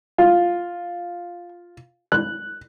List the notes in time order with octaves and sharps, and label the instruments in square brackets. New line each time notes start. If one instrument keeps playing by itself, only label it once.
[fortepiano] F4
F#6